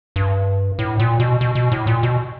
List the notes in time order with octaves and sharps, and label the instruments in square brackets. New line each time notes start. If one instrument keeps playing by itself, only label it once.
[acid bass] G2
A2
A#2
B2
B2
B2
A2
A#2
B2